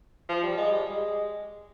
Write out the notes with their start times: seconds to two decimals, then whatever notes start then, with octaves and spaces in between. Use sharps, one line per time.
0.29 F3
0.43 G3
0.57 G#3
0.72 G3
0.86 G#3